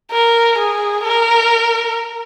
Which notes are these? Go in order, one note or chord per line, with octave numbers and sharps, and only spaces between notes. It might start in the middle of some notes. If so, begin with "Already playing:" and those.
A#4
G#4
A#4